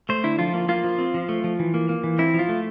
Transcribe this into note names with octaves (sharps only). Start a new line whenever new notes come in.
A3 C5
D3 E4
F3 F4
A#3
A#3 F4
F3
C4
F3
A3
F3
E3
A#3
A#3
E3
C4 E4
F3 F4
A3